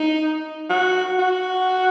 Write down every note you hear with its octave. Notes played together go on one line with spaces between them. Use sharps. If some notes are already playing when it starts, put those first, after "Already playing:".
Already playing: D#4
F#4
F#4